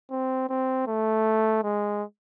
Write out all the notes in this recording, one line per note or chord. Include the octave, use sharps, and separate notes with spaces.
C4
C4
A3
G#3